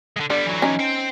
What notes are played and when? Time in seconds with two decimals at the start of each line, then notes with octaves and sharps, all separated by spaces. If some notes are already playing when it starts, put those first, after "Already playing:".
0.17 D3 G#3
0.30 D3 G3 B3
0.46 E3 F#3
0.62 C#4 D#4
0.79 C5 G5